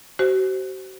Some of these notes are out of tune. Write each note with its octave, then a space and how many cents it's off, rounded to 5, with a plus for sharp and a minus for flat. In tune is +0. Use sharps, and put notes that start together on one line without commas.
F#4 +40 C5 +0